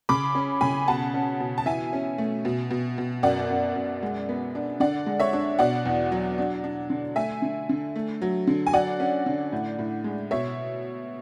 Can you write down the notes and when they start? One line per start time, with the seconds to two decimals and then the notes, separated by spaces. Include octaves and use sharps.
0.09 C#3 B5 D6
0.35 C#4
0.61 C#3 G#5 B5
0.88 B2 F#5 A5
1.14 C#4
1.40 B2
1.58 A5
1.66 E3 E5 G#5
1.93 C#4
2.18 A3
2.45 B2
2.70 B2
2.98 B2
3.23 F#2 D5 F#5
3.50 F#2
3.75 F#2
4.03 G#3
4.29 B3
4.55 D4
4.80 D3 D5 F#5
5.06 G#3
5.20 C#5 E5
5.33 D4
5.59 B2 D5 F#5
5.85 E2
6.12 F#3
6.38 D4
6.64 D4
6.90 D3
7.16 A3 E5 G#5
7.42 D3
7.69 D3
7.96 A3
8.22 F#3
8.47 D3
8.67 G#5
8.73 F#3 D5 F#5
9.00 C#4
9.26 D3
9.52 A2
9.79 A2
10.04 G#3
10.31 B2 C#5 E5